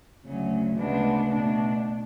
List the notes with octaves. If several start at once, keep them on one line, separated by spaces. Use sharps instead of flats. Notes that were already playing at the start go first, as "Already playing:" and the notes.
D2 C#3 F#3 C#4
D2 C#3 G#3 B3 D4
B2 A3 D4